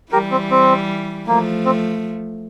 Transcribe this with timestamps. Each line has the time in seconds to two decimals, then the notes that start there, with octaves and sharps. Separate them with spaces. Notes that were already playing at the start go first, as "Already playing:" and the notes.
0.12 E3 G3 G4 A#4
0.31 C4
0.51 C4
1.27 F3 A3 A#3
1.65 C4